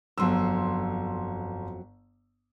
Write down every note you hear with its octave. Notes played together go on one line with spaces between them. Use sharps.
G1 F2 F#3 C6 E6